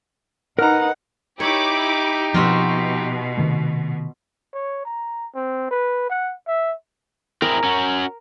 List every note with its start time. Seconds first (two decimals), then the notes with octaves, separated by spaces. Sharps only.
0.59 D#4 A#4 B4 F#5 A#5 F6
1.40 D#4 E4 G4 C#5 B5 D6
2.34 B2 F3 C4 F4 F#4 E5
3.37 C3 D#3 A3
4.54 C#5
4.85 A#5
5.35 C4
5.71 B4
6.10 F#5
6.47 E5
7.42 C4 E4 G#4 A#4
7.64 C#4 F#4